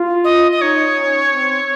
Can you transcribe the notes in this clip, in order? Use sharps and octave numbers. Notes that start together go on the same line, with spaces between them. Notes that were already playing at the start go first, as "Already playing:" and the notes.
Already playing: F4
D#5
D#5
D#4 C#5
C#4
C4